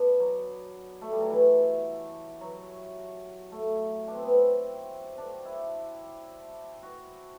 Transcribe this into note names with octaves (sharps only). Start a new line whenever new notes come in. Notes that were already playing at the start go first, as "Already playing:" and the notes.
Already playing: B3 D4
F#3
A3
G3
F#3
E3
F#3
A3
D4
C4
B3
C4
D4
E4
F#4